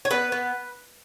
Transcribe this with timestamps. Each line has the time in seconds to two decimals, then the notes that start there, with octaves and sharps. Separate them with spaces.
0.05 C#5
0.11 B3 B4
0.32 B3